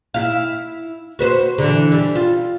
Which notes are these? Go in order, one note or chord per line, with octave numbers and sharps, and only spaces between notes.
E4 F5
F#4 B4 C5
D3 E3
G3
F4